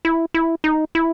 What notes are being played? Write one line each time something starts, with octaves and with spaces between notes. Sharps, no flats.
E4
E4
D#4
E4